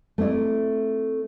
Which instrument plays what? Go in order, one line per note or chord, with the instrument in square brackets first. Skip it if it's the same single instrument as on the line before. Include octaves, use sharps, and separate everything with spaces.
[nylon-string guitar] A3 C4 E4 D5